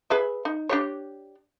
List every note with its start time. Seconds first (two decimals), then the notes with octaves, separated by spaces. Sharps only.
0.10 G#4 B4 E5
0.45 D#4
0.69 D4 G4 C#5